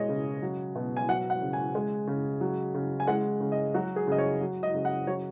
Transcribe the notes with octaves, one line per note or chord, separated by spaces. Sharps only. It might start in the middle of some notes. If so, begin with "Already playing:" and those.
Already playing: B2 G#3 C#5 D#5
C#3
F#3
B2
G#5
F#3 F#5
F#5
C#3
G#5
G#3
C#3
F#3
C#3
G#5
G#3 F#5
C#3
D#5
F#3 F#4
G#4
C#3 D#5
C#5
F#3
D#5
C#3
F#5
F#3 C#5